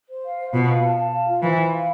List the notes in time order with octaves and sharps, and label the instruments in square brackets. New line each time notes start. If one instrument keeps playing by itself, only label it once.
[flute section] C5
F5
C5
[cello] B2 [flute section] F4
[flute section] F5
A5
A5
F5
F4
[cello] E3 [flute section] C5
[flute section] B5
F5